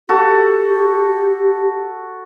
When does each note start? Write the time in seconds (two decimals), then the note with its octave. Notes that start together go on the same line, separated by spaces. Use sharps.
0.09 F#4 G4 A4